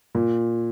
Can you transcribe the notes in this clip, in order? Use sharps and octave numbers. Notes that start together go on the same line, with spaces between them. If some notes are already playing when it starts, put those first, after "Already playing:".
A#2